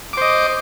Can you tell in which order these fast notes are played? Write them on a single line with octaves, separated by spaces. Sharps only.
D6 C5 D#5